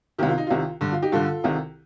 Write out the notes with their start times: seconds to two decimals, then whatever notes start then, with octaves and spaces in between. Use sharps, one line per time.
0.18 C2 C3 D#3 G4
0.29 F4
0.38 D#4
0.47 C2 C3 D#3 F4
0.81 G2 D3
0.92 F4
1.02 D#4 G4
1.12 G2 D3 F4 A4
1.44 C2 C3 D#3